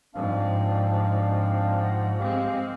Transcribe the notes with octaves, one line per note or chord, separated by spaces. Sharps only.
G#2 F3 C4 D4 F5
C5 F#5 A#5
G#3 C4 G4 F5